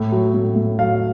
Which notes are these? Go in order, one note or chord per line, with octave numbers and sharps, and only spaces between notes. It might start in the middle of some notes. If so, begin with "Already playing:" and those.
Already playing: A2
F#3
A2
A2
F#3 F5